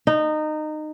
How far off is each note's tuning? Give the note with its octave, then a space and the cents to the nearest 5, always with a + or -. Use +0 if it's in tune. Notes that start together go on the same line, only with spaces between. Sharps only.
D#4 -20